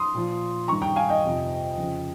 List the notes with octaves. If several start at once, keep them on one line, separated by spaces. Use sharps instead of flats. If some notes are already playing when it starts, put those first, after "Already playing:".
Already playing: C6 D#6
A#2 F3
G2 D#3 A#5 C#6
G5 A#5
F5 G#5
D#5 G5
F2 C3 F3
F2 C#3 F3